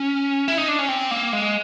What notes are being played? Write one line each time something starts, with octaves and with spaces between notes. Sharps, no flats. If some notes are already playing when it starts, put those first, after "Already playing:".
Already playing: C#4
E4
D#4
D4
C#4
C4
A#3
G#3